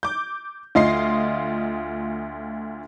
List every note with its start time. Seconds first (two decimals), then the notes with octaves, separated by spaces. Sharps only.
0.03 D6 G6
0.75 D2 F4 D#5 C6 C7